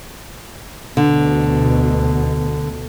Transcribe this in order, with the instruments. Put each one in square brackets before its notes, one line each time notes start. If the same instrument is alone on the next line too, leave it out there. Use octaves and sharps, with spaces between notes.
[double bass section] D2 B2 [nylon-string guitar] D3